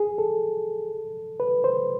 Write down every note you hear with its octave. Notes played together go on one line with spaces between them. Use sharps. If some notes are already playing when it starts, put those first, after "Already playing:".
Already playing: G#4
A4
B4
C5